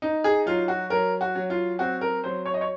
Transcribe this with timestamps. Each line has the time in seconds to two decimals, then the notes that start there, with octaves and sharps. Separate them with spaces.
0.02 D#4
0.24 G#4
0.46 F#3 F4
0.68 F#4
0.90 F#3 A#4
1.21 F#4
1.35 F#3
1.50 F4
1.79 C4 F#4
2.01 A#4
2.24 F#3 C5
2.46 C#5
2.54 D#5
2.61 C#5